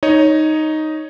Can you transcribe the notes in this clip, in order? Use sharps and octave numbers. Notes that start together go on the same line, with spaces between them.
D#4 C#5 D#5